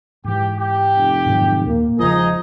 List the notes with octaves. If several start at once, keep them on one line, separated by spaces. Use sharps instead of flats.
G#2 E3 G4
G4
F1
G#2 D#3 F#3
D#2 A#2 A#3
E1 C#3 F3 D#4 G#4 D#5